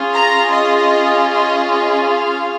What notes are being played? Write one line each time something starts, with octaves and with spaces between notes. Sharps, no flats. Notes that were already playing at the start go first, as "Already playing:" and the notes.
Already playing: C#4 F4 G#4
A#5
D#5
D#5
D#5
F5